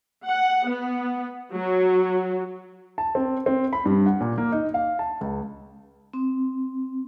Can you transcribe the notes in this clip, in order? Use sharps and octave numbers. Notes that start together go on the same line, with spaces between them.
F#5
B3
F#3
A5
C4
C4
B5
G2
F#5
A#2
A#3
D#4
F5
A5
C#2
C4